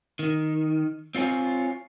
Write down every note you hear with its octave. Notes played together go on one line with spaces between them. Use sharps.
D#3
C4 F4 C#5 G#5